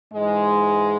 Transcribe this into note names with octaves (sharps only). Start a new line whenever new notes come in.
G#2 E3 G#3